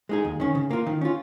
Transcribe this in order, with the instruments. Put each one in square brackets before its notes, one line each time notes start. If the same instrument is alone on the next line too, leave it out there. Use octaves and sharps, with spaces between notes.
[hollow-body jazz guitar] G#3 D#4 G#4
D#2
D#3 C#4
C#3
A#3 F4
D#3
C#4 F4